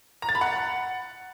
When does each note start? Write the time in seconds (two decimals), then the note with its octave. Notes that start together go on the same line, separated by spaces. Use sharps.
0.22 A#5
0.29 A6
0.35 B5
0.41 F#5